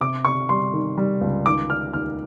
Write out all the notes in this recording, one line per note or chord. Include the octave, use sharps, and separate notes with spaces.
C3 D6
C3 C#6
G3 C6
D#3
G3
C#2
D#3 D6
D#3 F6
D#2 F6